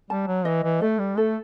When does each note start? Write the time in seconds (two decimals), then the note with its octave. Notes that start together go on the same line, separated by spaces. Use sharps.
0.10 G3 A5
0.27 F#3
0.45 E3 D#5
0.64 E3
0.81 A3 A4
0.99 G3
1.17 A3 A4